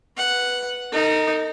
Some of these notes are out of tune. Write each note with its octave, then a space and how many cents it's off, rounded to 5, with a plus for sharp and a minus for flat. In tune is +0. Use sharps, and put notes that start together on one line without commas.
B4 +0 F#5 +0
D#4 +0 A#4 -45